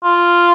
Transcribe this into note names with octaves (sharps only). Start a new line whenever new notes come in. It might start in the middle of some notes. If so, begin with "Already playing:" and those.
F4